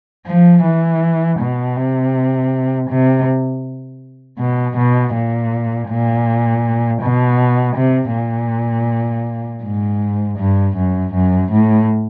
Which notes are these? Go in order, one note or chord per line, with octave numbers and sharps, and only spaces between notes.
F3
E3
B2
C3
C3
B2
B2
A#2
A#2
B2
C3
A#2
G#2
G2
F#2
F#2
A2